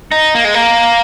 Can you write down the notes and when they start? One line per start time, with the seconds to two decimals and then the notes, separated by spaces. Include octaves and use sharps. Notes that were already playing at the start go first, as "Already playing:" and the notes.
0.12 D#4
0.35 A#3
0.44 G#3
0.54 A#3